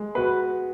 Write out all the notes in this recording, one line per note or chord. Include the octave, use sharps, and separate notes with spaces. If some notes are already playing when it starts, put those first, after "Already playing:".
Already playing: G#3
B3 F#4 B4